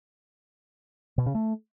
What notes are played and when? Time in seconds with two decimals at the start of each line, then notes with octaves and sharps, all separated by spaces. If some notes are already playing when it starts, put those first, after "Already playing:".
1.18 B2
1.26 C#3
1.35 A3